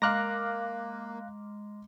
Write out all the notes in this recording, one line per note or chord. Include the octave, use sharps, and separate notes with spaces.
G#3 A#3 F5 A#5 D6 F6 F#6 A#6